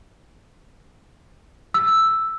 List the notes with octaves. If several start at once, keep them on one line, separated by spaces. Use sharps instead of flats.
E6